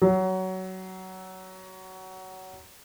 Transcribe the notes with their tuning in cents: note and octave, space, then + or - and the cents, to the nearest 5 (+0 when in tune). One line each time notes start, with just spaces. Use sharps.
F#3 +20